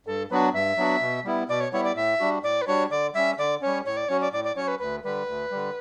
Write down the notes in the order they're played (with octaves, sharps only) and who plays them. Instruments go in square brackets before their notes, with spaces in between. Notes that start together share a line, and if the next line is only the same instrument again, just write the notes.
[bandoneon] G2 [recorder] A4
[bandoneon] F#3 B3 D4 F#4 [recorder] B4
[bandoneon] G2 [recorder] E5
[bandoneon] F#3 B3 D4 F#4
B2
G3 B3 E4
[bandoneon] B2 [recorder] D5
[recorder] C#5
[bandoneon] G3 B3 E4 [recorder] C#5
[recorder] D5
[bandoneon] A2 [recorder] E5
[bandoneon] G3 D4 F#4
[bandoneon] A2 [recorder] D5
[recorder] B4
[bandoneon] G3 D4 F#4 [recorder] C#5
[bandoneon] D3 [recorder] D5
[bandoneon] G3 C#4 [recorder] E5
[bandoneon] D3 [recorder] D5
[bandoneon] G3 C#4 [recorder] C#5
[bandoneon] A2 [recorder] C#5
[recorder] D5
[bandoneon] F#3 C#4 F#4 [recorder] C#5
[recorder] D5
[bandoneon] A2 [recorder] D5
[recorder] D5
[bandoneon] F#3 C#4 F#4 [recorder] C#5
[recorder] B4
[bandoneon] D2 [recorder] B4
[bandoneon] D3 G3 [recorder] B4
[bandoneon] D2
D3 G3